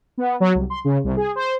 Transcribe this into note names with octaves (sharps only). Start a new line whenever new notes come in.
B3
F#3
C2
C6
C#3
C2
G#4
C5